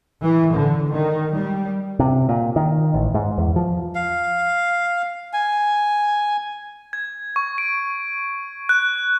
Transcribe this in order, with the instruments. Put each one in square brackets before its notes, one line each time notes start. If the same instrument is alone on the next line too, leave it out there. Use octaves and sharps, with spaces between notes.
[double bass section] E3
D3
D#3
G3
[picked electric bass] C3
A#2
D#3
A1
G#2
E2
F3
[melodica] F5
G#5
[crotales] G#6
C#6
D7
F#6